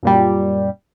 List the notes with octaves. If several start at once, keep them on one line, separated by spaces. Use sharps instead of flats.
F#2 A#2 G3